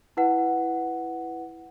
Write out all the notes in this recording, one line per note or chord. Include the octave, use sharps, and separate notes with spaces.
E4 B4 F#5